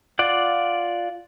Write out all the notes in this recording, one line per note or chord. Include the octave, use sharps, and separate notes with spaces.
F4 D5 F#5